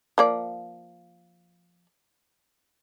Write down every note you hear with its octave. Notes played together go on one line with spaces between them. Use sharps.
F3 A#3 D5